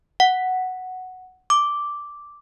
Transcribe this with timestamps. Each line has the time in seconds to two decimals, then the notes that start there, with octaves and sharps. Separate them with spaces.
0.20 F#5
1.50 D6